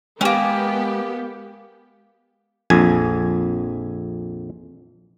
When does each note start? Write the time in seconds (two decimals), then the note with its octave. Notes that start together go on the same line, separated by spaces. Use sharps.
0.21 G#3 A#3 B3 C#4 G4 G5 G#5
2.70 A#1 F2 G#5